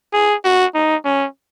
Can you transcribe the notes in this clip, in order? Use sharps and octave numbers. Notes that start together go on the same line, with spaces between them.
G#4
F#4
D#4
C#4